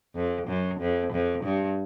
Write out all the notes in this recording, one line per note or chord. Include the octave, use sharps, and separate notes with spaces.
F2
F#2
F2
F2
G2